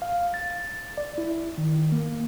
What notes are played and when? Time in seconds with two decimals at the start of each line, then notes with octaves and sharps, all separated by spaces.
0.02 F5
0.34 A6
0.98 D5
1.18 E4
1.58 D#3
1.92 A#3